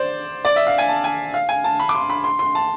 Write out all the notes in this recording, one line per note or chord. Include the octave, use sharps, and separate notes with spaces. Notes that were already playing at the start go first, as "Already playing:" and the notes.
Already playing: C5 D5
D5
E5
F5
G#5
A5
G#5
F5
G#5
A5
B5
D6
C6
B5
C6
C6
A5